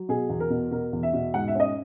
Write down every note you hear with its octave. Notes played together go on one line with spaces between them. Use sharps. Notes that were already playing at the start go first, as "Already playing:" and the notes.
Already playing: F#3
B2 G#4
E2
A#4
B2
B2 A#4
E2
E5
B2
G#2 F#5
E5
C#4 D#5